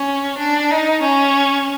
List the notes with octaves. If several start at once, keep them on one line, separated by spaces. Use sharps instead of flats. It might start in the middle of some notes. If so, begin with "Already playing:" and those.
Already playing: C#4
D4
D#4
C#4